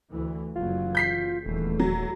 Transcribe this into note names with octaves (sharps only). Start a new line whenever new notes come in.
D2 E3
F#1 E3 F#3 F4
G6 B6 C7
D#1 E2 E3 A3
F#3